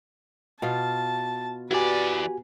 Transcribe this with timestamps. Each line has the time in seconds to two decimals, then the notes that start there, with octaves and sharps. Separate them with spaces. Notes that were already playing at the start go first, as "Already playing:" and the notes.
0.62 B2 F4 A5
1.71 E3 F#4 G4 B4 D5 G#5